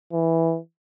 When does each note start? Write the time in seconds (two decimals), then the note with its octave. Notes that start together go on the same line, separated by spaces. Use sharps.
0.13 E3